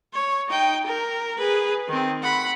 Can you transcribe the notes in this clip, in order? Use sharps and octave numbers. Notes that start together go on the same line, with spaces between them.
C#5
D#4 G5
A#4
G#4 B4
D#3 C4
F#5 B5